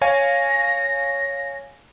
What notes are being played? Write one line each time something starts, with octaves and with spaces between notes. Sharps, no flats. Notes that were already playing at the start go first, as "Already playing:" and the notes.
C#5 F5 G#5 A#6